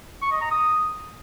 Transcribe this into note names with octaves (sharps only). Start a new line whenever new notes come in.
C#6
D#5
A#5
D#6